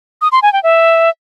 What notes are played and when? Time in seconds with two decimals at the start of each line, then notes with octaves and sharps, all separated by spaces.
0.22 D#6
0.32 C6
0.42 G#5
0.53 G5
0.63 E5